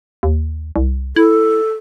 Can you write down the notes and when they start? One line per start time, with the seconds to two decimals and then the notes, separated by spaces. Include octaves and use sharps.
0.23 D#2
0.76 C2
1.16 E4 A4